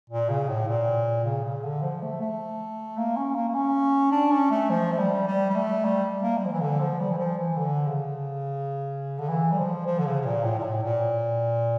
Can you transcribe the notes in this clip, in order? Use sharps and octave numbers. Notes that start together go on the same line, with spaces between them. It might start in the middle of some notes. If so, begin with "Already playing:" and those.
A#2
C#3
A2
A#2
C#3
C#3
D3
F3
A3
A3
A#3
C#4
A#3
A#3
C#4
D4
C#4
A3
F3
A3
G3
G3
G3
A3
G3
A#3
G3
F3
E3
D3
F3
G3
E3
F3
E3
D3
C#3
D3
E3
G3
F3
F3
D3
C#3
C#3
A#2
A2
A#2
A2
A#2